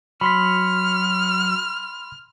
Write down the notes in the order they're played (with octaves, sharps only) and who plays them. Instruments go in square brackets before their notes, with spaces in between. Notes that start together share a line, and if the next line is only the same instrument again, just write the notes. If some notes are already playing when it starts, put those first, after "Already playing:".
[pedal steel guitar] F#3 [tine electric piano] B5 C6 B6 [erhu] F6